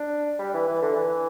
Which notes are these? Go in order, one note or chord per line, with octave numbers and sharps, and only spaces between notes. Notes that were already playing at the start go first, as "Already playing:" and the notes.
Already playing: D4
G3
E3
E3
D3
E3